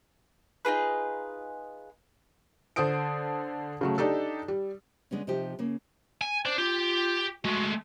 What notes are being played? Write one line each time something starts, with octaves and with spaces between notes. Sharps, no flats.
D#4 F4 G#4 B4
D3 A4 C5 D#6 D7
C#3 F#3 A3
D4 D#4 G4 A4
G3
D3 G#3 B3 C#4
C3 F3 D#4 G4
C#3 A#3
G#5
D4 C5
F4 G4
G#3 A3 F#4